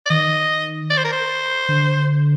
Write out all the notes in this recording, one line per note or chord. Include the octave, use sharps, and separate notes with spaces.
D5
D#3 D#5
D5
C5
A#4
C5
D3